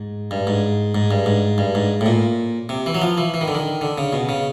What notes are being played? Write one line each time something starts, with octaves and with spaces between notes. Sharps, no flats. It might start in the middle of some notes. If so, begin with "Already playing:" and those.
Already playing: G#2
G2
G#2
G#2
G2
G#2
G2
G#2
A2
A#2
C3
E3
F#3
F3
E3
E3
D#3
D3
D#3
D3
C#3
B2
C#3